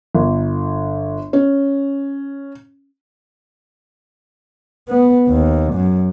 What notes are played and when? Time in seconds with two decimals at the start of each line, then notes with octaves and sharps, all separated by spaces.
0.15 G1
1.33 C#4
4.88 B3
5.28 D#2
5.73 F#2